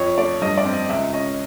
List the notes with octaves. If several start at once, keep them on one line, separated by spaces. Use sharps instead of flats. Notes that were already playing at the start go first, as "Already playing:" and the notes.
Already playing: F2 C#5
A3 D5
G2 D#5
D5
C4
D#5
C#2 E5
C#4 D#5